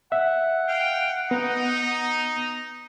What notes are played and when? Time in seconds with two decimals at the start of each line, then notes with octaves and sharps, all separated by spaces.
0.12 E5 F#5
0.68 F5 G5
1.31 B3 D#4